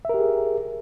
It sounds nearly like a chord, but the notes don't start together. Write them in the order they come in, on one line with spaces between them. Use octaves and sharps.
E5 A#4 G4 G#4